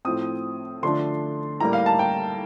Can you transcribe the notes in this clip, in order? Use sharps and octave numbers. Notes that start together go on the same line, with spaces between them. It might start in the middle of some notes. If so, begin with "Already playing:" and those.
A2 F3 C4 D#6
D3 F3 A3 D4 C6
A2 G3 A#3 A#5
F5
A5
G5